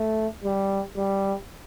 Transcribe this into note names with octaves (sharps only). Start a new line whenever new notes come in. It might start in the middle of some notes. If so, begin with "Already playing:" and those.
Already playing: A3
G3
G3